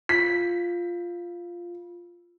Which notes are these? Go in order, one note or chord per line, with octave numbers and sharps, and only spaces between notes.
F4 B6